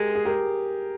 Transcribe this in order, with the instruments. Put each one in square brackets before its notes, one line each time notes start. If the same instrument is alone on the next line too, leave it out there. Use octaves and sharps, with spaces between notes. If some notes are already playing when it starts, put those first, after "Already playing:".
Already playing: [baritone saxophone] G#3 [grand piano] G4 A#4
[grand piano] G#4
G4 A#4